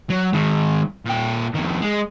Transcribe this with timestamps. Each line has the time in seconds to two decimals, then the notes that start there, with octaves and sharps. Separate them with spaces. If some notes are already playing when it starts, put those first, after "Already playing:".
0.10 F#3
0.33 D#3 G#3
1.06 A#2 G5
1.55 F2 D#3
1.82 G#3